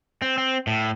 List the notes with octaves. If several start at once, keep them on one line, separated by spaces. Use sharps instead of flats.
C4
C4
A2